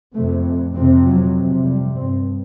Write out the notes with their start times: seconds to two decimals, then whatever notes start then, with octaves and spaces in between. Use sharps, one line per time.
0.15 F2 C3 A3
0.75 F2 C3 C4
1.05 F#3
1.35 F2 C3
1.64 G3
1.95 G2 C4